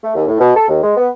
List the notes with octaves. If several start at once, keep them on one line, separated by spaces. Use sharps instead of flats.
A3
D#2
A2
B2
A4
D#2
G#3
B3